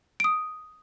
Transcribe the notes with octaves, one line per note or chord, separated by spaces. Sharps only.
D#6 D7